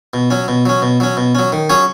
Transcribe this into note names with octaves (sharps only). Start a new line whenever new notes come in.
B2
F#3 C#4
B2
F#3 C#4
B2
F#3 C#4
B2
F#3 C#4
D#3
F#3 C#4 G#4 C#5